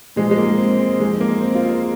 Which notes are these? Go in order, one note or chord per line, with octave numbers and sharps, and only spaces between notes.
A#2 F3 G#3
G#3
A#3
C4
C4
F2 F3 G#3
A#3
C4
F4
A#4